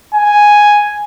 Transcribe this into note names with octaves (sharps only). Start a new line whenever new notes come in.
G#5